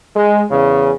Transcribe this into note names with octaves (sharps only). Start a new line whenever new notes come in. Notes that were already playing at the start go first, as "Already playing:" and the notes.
G#3
E2 C#3